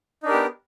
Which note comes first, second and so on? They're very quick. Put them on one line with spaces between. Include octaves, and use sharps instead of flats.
D#4 D4 A#4 G4 B3